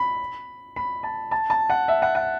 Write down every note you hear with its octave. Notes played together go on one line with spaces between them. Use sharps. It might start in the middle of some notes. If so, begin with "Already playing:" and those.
Already playing: B5
B5
A5
A5
A5
F#5
E5
F#5
F#5